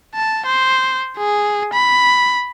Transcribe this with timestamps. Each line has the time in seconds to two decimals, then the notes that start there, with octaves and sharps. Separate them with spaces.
0.15 A5
0.46 C5
1.18 G#4
1.73 B5